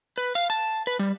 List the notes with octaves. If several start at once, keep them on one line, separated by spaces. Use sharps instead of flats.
B4
F5
A5
B4
G3